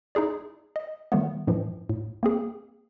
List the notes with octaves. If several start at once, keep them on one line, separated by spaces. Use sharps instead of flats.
D#4 E4 G#4 D5
D#5
D#3 G3 A3 B3
F#2 A2 E3 F3
A2
A#3 C4 G#4